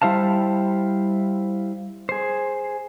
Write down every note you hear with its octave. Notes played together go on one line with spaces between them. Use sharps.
G3 E4 C5 F5 A5
G#4 C5